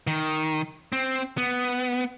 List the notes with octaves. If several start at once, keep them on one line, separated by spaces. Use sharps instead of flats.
D#3
C4
B3